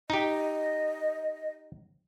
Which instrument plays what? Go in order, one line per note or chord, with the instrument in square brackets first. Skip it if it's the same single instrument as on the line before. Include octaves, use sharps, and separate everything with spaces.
[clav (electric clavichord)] D#4 G4 [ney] D#5